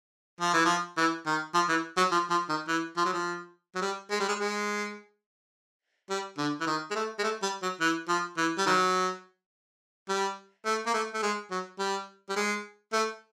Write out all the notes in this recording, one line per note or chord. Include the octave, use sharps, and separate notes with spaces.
F3
E3
F3
E3
D#3
F3
E3
F#3
F3
F3
D#3
E3
F3
F#3
F3
F#3
G3
G#3
G3
G#3
G#3
G3
D3
E3
D#3
G#3
A3
G#3
A3
G3
F#3
E3
F3
E3
G3
D#3 F#3
G3
A3
A#3
A3
A3
G#3
F#3
G3
G3
G#3
A3